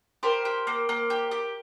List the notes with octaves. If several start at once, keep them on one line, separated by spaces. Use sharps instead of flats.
G4 A#4 C5
G4
A#3
A#3
G4
G4